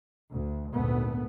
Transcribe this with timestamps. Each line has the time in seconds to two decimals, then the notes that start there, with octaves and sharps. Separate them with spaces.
0.31 D2
0.73 G#1 D2 A#2 A3 B3